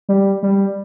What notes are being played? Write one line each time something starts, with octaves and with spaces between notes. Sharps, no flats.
G3
G3